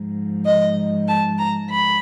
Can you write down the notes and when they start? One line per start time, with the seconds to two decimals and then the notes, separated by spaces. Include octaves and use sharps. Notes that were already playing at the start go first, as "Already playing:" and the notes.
Already playing: G#2 F3
0.45 D#5
1.07 A5
1.38 A#5
1.69 B5